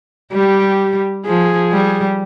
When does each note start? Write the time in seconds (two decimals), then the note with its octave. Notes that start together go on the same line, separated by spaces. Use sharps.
0.32 G3 G4
1.26 F3 G#4
1.72 G3